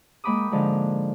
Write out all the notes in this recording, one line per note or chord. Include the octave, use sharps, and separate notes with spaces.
G#3 A#3 G5 B5 D6 D#6
G#2 D3 F3 G#3